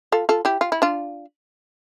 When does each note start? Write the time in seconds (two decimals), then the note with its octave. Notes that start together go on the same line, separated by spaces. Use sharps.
0.12 F4 A4
0.29 F4 A4
0.45 E4 G4
0.61 F4
0.72 E4
0.82 D4 F4